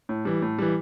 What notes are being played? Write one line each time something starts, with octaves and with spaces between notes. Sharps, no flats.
A2
E3 G3
A2
E3 G3